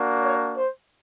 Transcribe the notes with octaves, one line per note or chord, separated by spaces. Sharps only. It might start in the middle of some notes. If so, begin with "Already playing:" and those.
Already playing: A#3 D4 F#4
C#5
C5